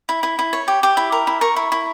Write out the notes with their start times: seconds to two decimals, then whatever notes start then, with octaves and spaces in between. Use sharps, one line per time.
0.09 E4
0.23 E4
0.39 E4
0.53 C#5
0.68 G4
0.83 G4
0.97 E4
1.12 A#4
1.27 E4
1.41 A#4 C#6
1.56 E4
1.72 E4